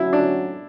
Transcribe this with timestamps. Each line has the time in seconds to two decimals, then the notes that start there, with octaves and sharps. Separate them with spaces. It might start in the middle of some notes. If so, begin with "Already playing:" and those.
Already playing: F#3 C#4 E4 F#4
0.13 D4